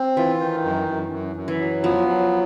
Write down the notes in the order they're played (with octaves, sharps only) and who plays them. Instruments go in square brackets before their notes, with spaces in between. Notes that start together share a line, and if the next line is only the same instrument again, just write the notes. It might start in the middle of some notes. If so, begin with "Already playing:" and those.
Already playing: [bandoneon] C4
[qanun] E3 [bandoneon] F4
[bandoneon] D#3
F#2
F#2
F#2
F#2
[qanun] E3
[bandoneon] F#3
[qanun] F3 [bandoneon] B3
[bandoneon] F#3